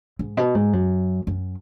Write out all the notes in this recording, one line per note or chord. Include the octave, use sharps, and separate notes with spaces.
G#2
B2
G#2
F#2
F#2